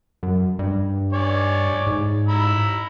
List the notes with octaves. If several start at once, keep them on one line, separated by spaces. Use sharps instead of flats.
F#2
G2
C#5 D5 G#5
G#2
A#5 B5 E6